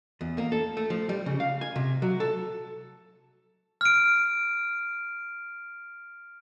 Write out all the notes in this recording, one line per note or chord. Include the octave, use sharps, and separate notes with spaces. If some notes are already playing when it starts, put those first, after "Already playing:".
E2
A#3
A4
A3
F3
G3
C#3
F5
G#5
C3
F#3
A4
F6 D7